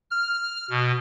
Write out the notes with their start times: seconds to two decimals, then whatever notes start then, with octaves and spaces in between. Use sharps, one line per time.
0.10 F6
0.70 B2